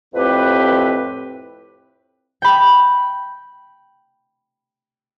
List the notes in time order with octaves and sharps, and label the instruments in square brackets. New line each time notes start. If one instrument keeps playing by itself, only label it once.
[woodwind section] F2 A2 C4 G4 B4
[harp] G5 B5